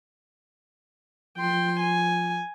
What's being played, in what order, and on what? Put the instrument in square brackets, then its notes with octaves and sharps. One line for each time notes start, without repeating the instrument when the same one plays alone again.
[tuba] F3 [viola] G5 C6
[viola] G#5